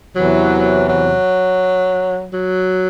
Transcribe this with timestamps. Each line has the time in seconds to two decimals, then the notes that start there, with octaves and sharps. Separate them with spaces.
0.16 E2 C3 E3 F#3
0.89 F#3
2.33 F#3